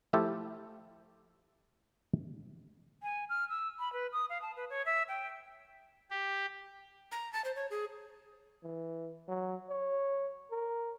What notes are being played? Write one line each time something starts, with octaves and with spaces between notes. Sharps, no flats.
F3 A3 E4 F4 G4 A4
G#5
F6
E6
B5
B4
D#6
F5
A5
B4
C#5
E5
G5
G4
A#5
A5
C5
C#5
G#4
E3
F#3
C#5
A#4